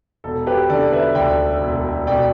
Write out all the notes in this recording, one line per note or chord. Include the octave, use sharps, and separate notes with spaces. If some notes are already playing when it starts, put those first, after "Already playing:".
E1 A4
G4 B4
D3 A4 D5
B4 E5
D2 D5 G5
E1
B2 D5 G5